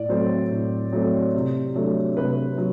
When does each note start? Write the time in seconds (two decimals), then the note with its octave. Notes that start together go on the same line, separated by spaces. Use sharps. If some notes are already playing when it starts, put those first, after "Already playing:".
Already playing: A2 D5
0.09 F#3 A3 C4 C5
0.51 A2
0.93 F#3 A3 C4
1.34 C3
1.76 F#3 A3 D4
2.17 C3 B4
2.58 F#3